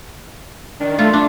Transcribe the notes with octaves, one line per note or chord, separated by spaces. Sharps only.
D#3 D4
A3 F4
A3 D4